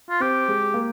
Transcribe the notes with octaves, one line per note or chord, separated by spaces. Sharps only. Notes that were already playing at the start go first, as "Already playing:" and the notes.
F4
C4 G4
G#3
A#3